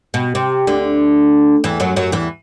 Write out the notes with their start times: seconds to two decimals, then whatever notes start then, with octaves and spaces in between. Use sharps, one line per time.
0.14 B2
0.35 C3
0.67 D2 D3
1.64 E2 E3
1.80 F#2 F#3
1.96 F#2 F#3
2.12 E2 E3